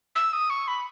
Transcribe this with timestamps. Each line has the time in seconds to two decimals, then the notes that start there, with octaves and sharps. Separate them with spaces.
0.15 E6
0.33 D#6
0.50 C#6
0.68 B5